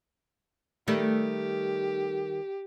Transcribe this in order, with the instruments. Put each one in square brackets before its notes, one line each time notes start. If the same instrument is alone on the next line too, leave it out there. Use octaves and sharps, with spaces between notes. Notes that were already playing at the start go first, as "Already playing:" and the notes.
[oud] D#3 G3 A3 [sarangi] G4